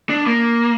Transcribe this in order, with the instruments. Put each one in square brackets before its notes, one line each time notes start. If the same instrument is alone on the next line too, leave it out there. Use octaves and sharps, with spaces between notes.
[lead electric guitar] D4
A#3